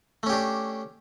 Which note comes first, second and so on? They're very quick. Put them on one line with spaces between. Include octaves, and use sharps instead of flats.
A3 C#4 G4 D4